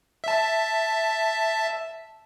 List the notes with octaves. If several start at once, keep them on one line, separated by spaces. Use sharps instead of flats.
E5 A5